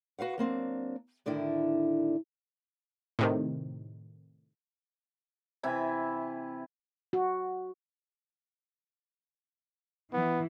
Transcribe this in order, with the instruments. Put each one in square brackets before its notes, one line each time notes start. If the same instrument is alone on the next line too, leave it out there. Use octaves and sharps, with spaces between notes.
[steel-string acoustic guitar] F#4 B4 F5 F#5
F#3 A#3 C4 D4
A2 D3 D#3 D4 E4
[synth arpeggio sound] A2 C3 D#3
[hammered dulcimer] C3 E3 E4 B5
[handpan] F#4
[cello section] E3 [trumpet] B3